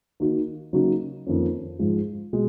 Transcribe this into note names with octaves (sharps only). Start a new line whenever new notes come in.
D#3 A#3 D#4 F#4
C#3 F#3 A#3 D#4 F#4
F2 D#3 A#3 C#4
G#2 F3 G#3
B2 G#3